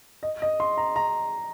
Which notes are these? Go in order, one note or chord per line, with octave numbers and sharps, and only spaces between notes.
D#5
D#5
C6
A#5
A#5